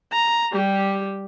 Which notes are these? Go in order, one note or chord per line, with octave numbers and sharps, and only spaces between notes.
A#5
G3 G4